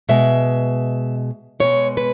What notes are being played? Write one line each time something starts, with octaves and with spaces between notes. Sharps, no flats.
B2 G#3 E5
B2 G#3 C#5
B4